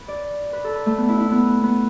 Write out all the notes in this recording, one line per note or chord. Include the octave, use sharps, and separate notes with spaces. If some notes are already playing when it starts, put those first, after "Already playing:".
Already playing: B4
D5
B4
A4
B4
A3
B3
E4
E4
B3
B3